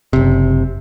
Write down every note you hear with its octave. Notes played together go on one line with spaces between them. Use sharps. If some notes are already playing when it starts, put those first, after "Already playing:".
F#1 C3